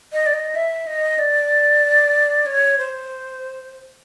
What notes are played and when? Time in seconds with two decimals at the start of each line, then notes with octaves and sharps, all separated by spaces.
0.12 D#5
0.26 D5
0.33 D#5
0.55 E5
0.87 D#5
1.18 D5
2.46 C#5
2.78 C5